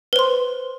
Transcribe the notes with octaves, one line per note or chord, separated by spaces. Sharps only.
B4 C5 C6